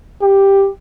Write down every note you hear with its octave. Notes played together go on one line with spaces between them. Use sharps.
G4